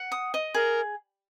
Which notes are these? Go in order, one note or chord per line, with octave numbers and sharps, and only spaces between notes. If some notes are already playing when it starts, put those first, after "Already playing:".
Already playing: F#5
D#6
D#5
G#4 A#4